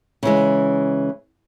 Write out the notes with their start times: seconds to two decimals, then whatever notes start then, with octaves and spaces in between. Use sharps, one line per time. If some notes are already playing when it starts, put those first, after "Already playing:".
0.23 C#3 E3 G#3